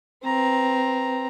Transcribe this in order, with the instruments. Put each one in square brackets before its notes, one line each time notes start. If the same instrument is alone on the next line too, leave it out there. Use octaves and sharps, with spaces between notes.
[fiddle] C4 B4 [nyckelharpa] A#5